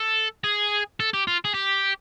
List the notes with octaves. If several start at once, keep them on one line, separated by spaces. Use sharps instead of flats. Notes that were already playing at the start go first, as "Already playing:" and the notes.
Already playing: A4
G#4
A4
G4
F4
G#4
G4